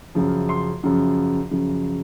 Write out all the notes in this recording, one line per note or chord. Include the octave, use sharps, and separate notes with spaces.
F#2 C#3 F3
C6
F#2 C#3 F3
F#2 C#3 F3